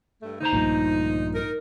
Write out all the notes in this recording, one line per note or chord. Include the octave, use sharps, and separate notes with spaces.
G2 A3
D2 D#4 C5 A#5
A#1 G2 A#2
D#4 A#4